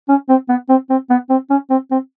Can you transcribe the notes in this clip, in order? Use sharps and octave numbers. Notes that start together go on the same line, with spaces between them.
C#4
C4
B3
C4
C4
B3
C4
C#4
C4
C4